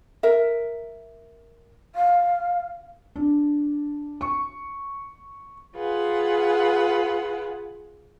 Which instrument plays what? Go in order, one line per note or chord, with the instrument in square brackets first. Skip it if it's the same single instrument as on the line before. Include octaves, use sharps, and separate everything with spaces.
[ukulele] A#4 E5
[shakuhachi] F5
[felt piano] D4
C#6
[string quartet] F4 G#4 B4 F#5